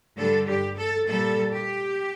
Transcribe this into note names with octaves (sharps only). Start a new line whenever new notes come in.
G2 D3 G3 A4
G4
A4
A#2 G3 A4
G4